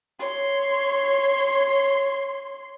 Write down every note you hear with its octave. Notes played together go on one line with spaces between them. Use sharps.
C#5 C6